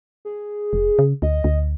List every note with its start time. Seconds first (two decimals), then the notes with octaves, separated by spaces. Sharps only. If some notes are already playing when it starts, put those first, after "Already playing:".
0.25 G#4
0.73 F1
0.99 C#3
1.22 D2 D#5
1.44 D2